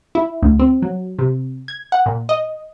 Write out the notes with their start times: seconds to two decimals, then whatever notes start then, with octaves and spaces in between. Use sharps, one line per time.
0.15 E4
0.43 D2
0.59 C4
0.82 F#3
1.19 C3
1.68 G#6
1.92 F#5
2.06 A#2
2.29 D#5